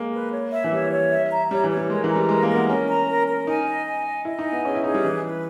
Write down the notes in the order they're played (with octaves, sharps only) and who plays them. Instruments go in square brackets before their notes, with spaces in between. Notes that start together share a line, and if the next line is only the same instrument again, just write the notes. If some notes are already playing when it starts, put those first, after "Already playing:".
Already playing: [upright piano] G#3 A#3
[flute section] B4
C#5
E5
[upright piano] E3
[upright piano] G3 [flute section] C#5
[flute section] C#5
E5
A#5
[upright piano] G3 [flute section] C#5
[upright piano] E3
[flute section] C#5
[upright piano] G3
[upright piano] G#3 [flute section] A#4
[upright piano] E3
[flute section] A#5
[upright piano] G3
[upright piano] G#3 [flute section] A#4
[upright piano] A#3
[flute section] A#4
[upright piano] B3
[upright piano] C#4 [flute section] A#4
[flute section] A#5
A#4
A#4
[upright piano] D#4 [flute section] G#5
[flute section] D#5
G#5
D#5
[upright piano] E4 [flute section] D#5
[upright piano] D#4
[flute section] G#5
[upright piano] B3
[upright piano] C#4 [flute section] G#4
[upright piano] E4
[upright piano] D#4 [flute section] G#4
[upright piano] G3
[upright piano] E3 [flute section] B4
[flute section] B4